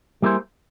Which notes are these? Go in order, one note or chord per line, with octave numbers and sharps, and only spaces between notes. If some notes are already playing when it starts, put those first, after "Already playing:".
G3 A#3 E4 G#4 C5